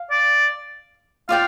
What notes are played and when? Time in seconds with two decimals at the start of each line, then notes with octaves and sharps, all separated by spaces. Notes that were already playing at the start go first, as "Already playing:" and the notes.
Already playing: F5
0.11 D5
1.29 F4 D5 F5 G5